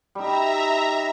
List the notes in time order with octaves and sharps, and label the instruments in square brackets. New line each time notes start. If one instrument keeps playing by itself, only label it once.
[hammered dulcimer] G3 D#4 [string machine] E5 A#5